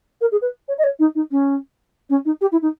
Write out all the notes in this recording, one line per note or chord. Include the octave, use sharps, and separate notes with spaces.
A#4
G#4
B4
C#5
D#5
C#5
D#4
D#4
C#4
C#4
D#4
G4
E4
D#4